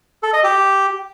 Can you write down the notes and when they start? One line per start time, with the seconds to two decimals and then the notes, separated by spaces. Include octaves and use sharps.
0.23 A4
0.33 D#5
0.44 G4